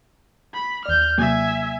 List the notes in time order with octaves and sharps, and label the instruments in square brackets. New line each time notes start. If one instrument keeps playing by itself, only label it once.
[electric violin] B5
[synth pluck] D#2 D5 [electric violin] F6 G6
[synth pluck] C3 F#3 A#3 [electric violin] E5 G#5